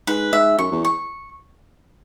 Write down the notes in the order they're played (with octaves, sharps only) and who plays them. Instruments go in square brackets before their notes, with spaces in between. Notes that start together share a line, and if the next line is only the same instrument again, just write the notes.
[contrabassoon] G#2 [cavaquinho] B4
[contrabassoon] G#2 [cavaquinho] E5
[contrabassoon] F#2 [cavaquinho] C#6
[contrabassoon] E2
[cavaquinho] C#6